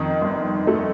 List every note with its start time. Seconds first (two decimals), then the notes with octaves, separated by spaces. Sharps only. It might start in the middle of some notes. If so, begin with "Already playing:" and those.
Already playing: F2 D#3
0.21 G1
0.67 A3